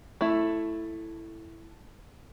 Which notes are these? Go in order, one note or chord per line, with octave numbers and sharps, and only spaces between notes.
A3 E4